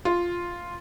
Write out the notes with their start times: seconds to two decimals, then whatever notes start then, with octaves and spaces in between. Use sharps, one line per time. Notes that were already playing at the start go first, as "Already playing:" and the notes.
0.05 F4